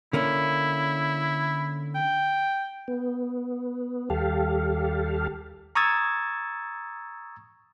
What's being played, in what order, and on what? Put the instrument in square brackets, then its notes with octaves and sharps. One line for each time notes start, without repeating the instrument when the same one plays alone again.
[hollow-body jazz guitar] D3 A#3 C#4 [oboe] E4
[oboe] G5
[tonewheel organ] B3
D#2 G3 G4 A4 F5
[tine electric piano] A#5 C#6 D#6 E6 G#6 A6